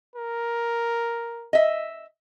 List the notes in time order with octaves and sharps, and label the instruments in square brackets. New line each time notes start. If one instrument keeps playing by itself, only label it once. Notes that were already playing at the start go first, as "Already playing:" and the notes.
[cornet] A#4
[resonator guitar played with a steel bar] D#5 E5